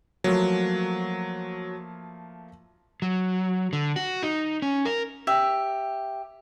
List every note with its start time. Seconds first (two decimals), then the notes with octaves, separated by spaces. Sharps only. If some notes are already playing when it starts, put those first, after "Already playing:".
0.24 F3 F#3 A3 A#3
3.02 F#3
3.73 D3
3.96 F#4
4.23 D#4
4.62 C#4
4.85 A#4
5.27 G4 E5